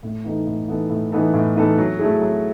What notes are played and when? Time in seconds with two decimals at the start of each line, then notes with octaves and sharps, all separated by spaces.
0.03 A2
0.24 E3 B3 D#4 A4
0.47 A2
0.68 E3 B3 D#4 A4
0.90 A2
1.12 E3 B3 D#4 A4
1.34 A2
1.56 E3 B3 D#4 A4
1.78 F#3
1.99 A3 E4 G#4
2.21 F#3